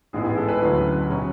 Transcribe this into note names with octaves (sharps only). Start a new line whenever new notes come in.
A1 G#2 G#3 B3 E4 G#4
G#4
A4
B4
D2 D3 F#3 C#4 E4
B2 F#3 C#4